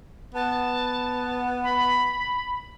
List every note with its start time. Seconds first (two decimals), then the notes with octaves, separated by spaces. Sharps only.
0.35 B3 A5
1.64 B5